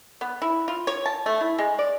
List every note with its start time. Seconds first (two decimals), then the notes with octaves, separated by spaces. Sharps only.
0.21 B3
0.42 E4
0.68 F4
0.87 C#5
1.06 A5
1.26 A3
1.41 E4
1.58 G#3
1.79 D5